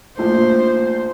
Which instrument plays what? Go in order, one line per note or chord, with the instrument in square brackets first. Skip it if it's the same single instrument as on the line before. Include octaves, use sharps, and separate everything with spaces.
[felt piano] A#1 A3 [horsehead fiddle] C5